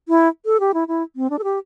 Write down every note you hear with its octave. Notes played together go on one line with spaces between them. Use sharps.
E4
A4
G4
E4
E4
C4
D4
A4
G4